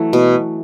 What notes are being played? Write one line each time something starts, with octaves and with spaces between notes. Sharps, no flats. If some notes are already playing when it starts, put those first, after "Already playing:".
Already playing: E3 F#3 A3
B2